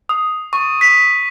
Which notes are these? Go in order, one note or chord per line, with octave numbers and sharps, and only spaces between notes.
D#6
C#6
B6